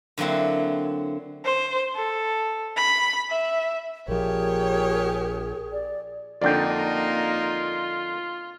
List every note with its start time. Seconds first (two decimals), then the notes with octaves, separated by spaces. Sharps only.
0.18 D3 F#3 A#3 C4 E4
1.45 C5
1.95 A4
2.77 B5
3.30 E5
4.08 A#1 F3 G4 G#4 A#4 C#5
5.72 D5
6.42 F2 D3 A#3 D4 D#4 F4 D5 G5